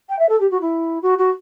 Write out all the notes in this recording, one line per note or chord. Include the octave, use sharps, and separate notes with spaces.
G5
E5
A4
G4
F#4
E4
F#4
F#4